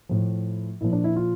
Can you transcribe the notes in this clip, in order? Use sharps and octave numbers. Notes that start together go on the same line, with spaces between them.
A2 F3
A#2 F3 E4
D4
E4
F4